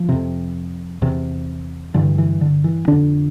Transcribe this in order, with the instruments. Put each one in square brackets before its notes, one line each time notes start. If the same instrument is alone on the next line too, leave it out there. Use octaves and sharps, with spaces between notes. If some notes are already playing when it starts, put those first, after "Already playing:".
Already playing: [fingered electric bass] F3
F2 C3
E2 C3
G2 D3 E3
E3
D3
E3
F2 D3 D4